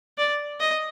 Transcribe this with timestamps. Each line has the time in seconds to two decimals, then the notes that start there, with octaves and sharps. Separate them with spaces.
0.18 D5
0.60 D#5